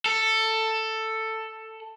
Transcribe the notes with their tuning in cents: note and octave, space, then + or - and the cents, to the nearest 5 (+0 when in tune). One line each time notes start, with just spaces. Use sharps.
A4 +10